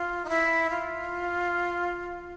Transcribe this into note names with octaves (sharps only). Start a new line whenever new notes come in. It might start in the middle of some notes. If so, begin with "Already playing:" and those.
Already playing: F4
D#4
E4
F4